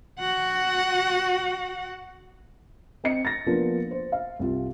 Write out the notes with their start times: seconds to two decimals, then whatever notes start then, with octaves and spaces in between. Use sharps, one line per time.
0.20 F#4 F#5
3.04 C4 D#5 C#7
3.25 A6 A#6
3.47 F3 A#3 B3 D4 F4
3.91 C5
4.12 F5
4.39 C2 F4